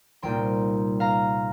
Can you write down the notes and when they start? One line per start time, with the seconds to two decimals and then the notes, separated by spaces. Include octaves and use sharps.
0.22 C2 A#2 A#3 D#4 G5 C6
1.00 F5 A#5